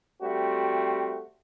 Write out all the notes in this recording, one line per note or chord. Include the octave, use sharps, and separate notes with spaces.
G3 A3 C4 F#4